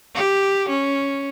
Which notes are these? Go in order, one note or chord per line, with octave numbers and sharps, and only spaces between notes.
G4
C#4